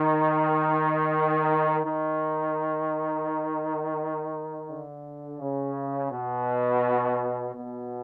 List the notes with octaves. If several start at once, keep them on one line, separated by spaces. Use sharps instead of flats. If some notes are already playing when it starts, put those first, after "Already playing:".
Already playing: D#3
D#3
D3
C#3
B2
B2